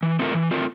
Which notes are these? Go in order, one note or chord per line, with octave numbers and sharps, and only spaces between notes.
E3
A3 C4 F4 A#4
E3
A3 C4 F4 A#4